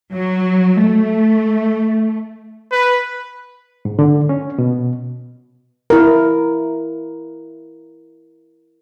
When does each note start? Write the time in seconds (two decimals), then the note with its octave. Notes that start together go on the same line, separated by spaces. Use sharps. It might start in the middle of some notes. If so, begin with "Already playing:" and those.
0.13 F#3
0.80 A3
2.72 B4
3.85 G#2
3.99 D3
4.29 C#4
4.58 B2
5.90 E4 A#4